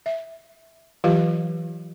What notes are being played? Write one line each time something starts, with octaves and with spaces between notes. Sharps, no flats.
E5
E3 F#3 F4 G4 B4 F5